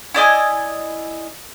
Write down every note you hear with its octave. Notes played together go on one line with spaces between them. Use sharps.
E4 D5 D#5 G#5